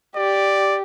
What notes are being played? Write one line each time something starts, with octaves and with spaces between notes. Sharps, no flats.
G4 D5